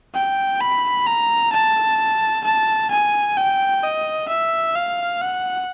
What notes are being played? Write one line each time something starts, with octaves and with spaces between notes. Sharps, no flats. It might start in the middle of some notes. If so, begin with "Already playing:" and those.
G5
B5
A#5
A5
A5
G#5
G5
D#5
E5
F5
F#5